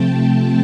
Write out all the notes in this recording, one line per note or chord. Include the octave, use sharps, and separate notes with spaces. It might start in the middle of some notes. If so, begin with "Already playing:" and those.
Already playing: C3 F3 A3 C4 G5 A5